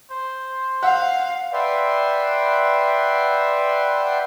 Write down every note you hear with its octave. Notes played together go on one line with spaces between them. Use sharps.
C5
F5 F#5
B4 D5 E5 F#5 G5 C6